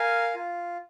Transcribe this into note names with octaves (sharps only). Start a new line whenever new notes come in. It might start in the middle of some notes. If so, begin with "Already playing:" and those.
Already playing: A#4 F5 G#5
F4